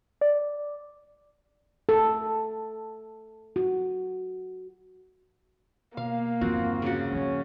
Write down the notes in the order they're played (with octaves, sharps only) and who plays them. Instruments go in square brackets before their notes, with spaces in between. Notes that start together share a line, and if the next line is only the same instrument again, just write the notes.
[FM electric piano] D5
[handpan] A4
F#4
[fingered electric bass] B2 [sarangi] A#3 [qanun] F5
[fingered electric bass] E2 G2 D3 [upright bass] F3 D#4 [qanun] C4 F4 F#4
[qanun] C#3 F#4
[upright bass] F3 A#3 [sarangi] C#4